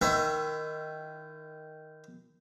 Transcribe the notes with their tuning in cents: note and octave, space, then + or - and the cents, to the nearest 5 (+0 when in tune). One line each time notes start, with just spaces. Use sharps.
D#3 +0 E4 +40 E5 +20